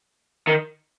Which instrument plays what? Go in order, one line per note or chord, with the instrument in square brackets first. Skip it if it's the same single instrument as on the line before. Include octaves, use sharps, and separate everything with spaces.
[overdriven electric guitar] D#3